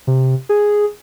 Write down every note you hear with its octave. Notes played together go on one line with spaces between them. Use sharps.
C3
G#4